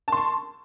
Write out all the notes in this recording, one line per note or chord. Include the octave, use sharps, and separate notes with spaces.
A5 C6 C#6